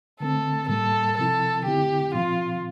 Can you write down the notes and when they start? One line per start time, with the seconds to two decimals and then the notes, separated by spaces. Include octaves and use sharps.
0.20 D3 A3 C4 A4
0.68 A2 G3 A#3 A4
1.17 C3 F3 C4 E4 A4
1.65 D3 A3 C4 E4 G4
2.14 A#2 F3 C4 F4